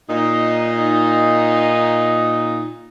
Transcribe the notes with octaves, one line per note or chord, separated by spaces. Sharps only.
A#2 D#4